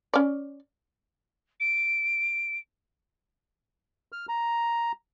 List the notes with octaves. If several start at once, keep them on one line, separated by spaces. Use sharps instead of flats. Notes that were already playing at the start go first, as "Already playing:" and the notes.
C#4 D5
D7
F6
A#5